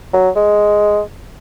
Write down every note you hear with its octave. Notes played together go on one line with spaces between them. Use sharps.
F#3
G#3